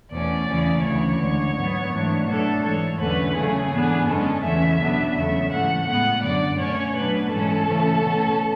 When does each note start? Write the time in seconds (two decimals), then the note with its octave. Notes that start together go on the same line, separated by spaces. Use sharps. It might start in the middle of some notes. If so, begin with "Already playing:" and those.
0.11 E2 B2 A3 C#4 D5
0.48 E2 C#3 E3 A3 C#4
0.83 D2 C#3 E3 C#5
1.19 D2 D3 G#3
1.55 G#2 F#3 B3
1.91 G#2 E3 A3 D4
2.26 B2 F#3 A3 D4 A4
2.62 G#2 E3 G#3 C#5
2.99 E2 D3 F#3 A3 C#4 B4
3.34 C#3 F#3 A3 C#4 G#4
3.71 G#2 E3 B3 D4
4.07 F#2 D3 G#3 C#4 A4
4.42 E2 C#3 E3 A3 C#4 E5
4.79 B2 F#3 B3 D4
5.15 E2 C#3 F#3 A3 E5
5.51 G#2 E3 A3 F#5
5.86 A2 G#3 B3 F#5
6.22 F#2 D3 F#3 D5
6.58 B2 A3 C#4 C#5
6.94 B2 F#3 A3 D4 B4
7.30 G#2 E3 G#3 C#4 A4
7.67 C#3 E3 A3 C#4
8.03 B2 A3 C#4